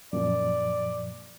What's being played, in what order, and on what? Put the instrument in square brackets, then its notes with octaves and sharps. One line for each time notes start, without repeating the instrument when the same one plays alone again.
[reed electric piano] F#2 A#2 F3 [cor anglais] D5